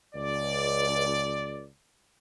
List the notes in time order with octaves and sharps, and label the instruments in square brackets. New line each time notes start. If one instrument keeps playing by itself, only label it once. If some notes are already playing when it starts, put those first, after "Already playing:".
[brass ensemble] C#2 D5